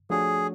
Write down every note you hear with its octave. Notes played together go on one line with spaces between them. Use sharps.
F3 A3 D4 F#4 G#4 C#5